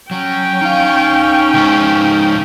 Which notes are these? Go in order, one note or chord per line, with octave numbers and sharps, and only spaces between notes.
F#3 C#4 G5
D#4 F5
C#2 G#2